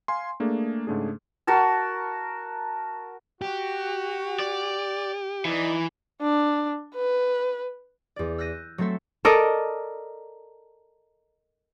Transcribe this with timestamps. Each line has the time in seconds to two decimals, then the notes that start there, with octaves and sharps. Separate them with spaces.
0.08 F5 G#5 C6
0.40 A3 A#3 D4 G#4
0.87 G#2 C#3 A3 D4 G#4
1.47 F#4 A#4 A5
3.42 F#4 G4
4.39 D5
5.45 E3 D#4 D5
6.21 D4
6.95 B4
8.16 E2 D5
8.38 E6 F#6 G6 A#6 D#7
8.78 F#3 A3 C4 A4 E5
9.25 A4 A#4 D5 D#5